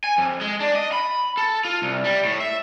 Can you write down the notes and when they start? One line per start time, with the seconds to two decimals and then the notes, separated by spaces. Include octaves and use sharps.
0.04 G#5
0.18 F2
0.41 G#3
0.60 D4
0.75 D#5
0.92 B5
1.37 A4
1.65 F4
1.82 C2
2.04 G3
2.25 A2
2.40 E5